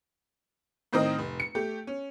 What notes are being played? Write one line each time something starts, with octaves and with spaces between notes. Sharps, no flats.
A2 D#3 C4 A#4 D#5 D#6
F1
C#7
A3 G4
C#4